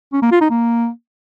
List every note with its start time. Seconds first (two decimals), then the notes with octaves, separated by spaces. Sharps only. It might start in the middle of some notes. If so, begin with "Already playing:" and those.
0.13 C#4
0.22 A#3
0.32 F4
0.41 D#4
0.50 A#3